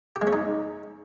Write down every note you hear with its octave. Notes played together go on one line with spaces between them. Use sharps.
G4
G#3
C#4
D#4